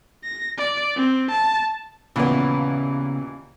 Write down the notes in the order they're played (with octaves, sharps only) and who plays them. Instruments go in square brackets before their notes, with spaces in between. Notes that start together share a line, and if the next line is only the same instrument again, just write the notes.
[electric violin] A#6
D5
C4
A5
[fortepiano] D#2 A#2 E3 [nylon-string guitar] C#3 B3